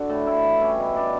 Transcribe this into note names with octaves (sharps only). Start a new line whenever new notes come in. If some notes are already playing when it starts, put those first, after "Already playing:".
Already playing: D3 F#4
A2
A2 E4
E3
G3 C#4
B2
B3 D4